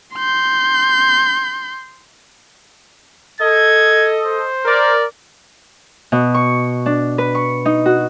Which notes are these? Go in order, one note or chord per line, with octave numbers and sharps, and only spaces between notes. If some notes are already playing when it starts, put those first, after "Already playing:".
C6 G6
A4 D#5 G#6
C5
A#4 D5
B2
C#6
D4
B4
C#6
D#4
F#4